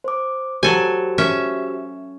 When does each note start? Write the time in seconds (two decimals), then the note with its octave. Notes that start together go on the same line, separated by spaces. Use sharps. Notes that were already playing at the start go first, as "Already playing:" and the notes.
0.04 C5 D6
0.63 F#3 F#4 G4 A4 C5 G#5
1.18 C#4 E5